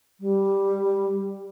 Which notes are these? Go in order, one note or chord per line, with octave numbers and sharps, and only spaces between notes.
G3